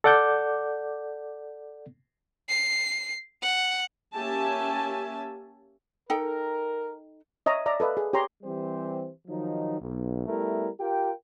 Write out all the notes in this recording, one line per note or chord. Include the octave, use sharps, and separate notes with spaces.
A4 D5 F#5 D6 G6
C7
F#5
A#3 C#4 G4 E5 G#5 A5
D#4 A4 A#4 G5
C#5 D#5 E5 A#5
D5 E5 A#5 D#6
A4 B4 D#5 F5
G#4
G4 C#5 G5 A#5 C6
E3 G3 C4 G4 C5
D#3 F3 F#3 D#4
B1
G3 A3 B3 E4 A#4
F4 G4 A#4 G5